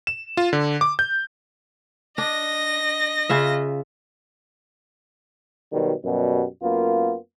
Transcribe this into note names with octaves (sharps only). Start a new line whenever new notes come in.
E7
F4
D3
D6
G6
D4 D#5 A#6
C#3 F4 E5
B2 D#3 F#3 G3
F#2 B2 G3
F#2 A#3 B3 F4